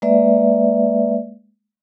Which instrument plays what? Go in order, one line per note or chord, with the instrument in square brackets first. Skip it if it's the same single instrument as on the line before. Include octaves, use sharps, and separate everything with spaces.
[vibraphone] G#3 A#3 B4 D5 E5